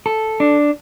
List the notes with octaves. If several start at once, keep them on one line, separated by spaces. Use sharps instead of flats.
A4
D4